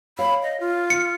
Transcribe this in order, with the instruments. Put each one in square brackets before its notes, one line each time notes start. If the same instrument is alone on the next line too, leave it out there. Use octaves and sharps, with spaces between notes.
[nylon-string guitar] C#5 F5 [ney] B5
[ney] D#5
F4
[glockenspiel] C#7